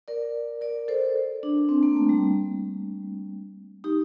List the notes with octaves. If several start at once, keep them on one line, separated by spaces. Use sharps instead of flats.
A#4 D5
A#4 D5
A4 C5
D4
C4
A#3
A3
G3
D#4 G4